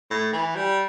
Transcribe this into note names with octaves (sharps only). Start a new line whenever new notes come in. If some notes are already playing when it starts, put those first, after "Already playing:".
A2
E3
G3